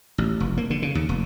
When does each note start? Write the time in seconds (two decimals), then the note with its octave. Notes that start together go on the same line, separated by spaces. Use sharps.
0.18 A1
0.40 F1
0.57 A#3
0.70 D3
0.82 C#3
0.95 D#2
1.09 F1